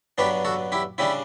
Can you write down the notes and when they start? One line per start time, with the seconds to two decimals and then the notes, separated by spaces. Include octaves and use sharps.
0.18 G2 F#3 B3 D4 G4 B4
0.45 F#4 A4
0.72 E4 G4
0.98 C#3 G3 D4 E4 G4